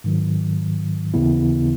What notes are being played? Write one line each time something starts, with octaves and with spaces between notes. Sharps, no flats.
G#2 D#3 F#3
D#2 C#3 E3 B3 E4